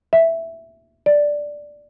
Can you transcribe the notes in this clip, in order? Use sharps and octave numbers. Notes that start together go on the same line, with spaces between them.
E5
D5